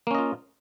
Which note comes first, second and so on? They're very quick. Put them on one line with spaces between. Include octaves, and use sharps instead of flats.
A#3 C#4 D#5 F4